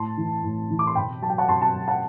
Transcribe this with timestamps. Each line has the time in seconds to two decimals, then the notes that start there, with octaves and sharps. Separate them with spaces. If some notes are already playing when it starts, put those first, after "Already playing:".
Already playing: A2 A5 C6
0.17 E3
0.43 A2
0.70 E3
0.79 D6
0.87 C6
0.95 B2 G5 B5
1.22 F#3 A5
1.30 G5
1.38 F#5 A5
1.48 B2 A5 C6
1.62 A5 C6
1.75 F#3
1.88 F#5 A5